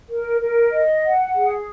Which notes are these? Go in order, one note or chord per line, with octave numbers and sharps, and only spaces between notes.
A#4
A#4
D#5
F#5
G#4